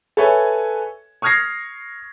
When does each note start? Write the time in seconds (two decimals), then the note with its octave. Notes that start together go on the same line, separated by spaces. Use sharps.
0.17 A4 B4 C#5 E5 G#5
1.22 C#6 D#6 F6 G#6 A#6 C7